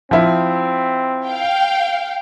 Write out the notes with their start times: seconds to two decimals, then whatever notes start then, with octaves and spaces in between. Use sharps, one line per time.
0.11 F3 C4 E4
1.26 F5 G5